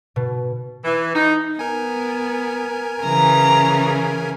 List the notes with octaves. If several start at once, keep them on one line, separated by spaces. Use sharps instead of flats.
B2
E3
D#4
B3 A#4 G#5
C#3 E3 A#5